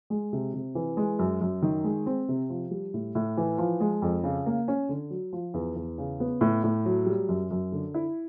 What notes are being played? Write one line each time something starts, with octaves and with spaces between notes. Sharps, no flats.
G#3
C3
C3
E3
G#3
F#2
F#2
D#3
G#3
C4
C3
F3
G3
A2
A2
E3
F3
G#3
F2
C#3
A#3
C#4
D3
F#3
F3
E2
E2
C#3
B3
A2
A2
F#3
G3
F#2
F#2
D3
E4